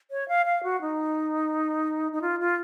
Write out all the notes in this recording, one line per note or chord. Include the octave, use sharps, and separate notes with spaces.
C#5
F5
F5
F#4
D#4
D#4
F4
F4